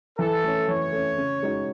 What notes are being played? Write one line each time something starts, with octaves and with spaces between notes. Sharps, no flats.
E3 A4
A3 C#4
E3 C#5
A3 C#4
C#3
G#3 D#4 F#4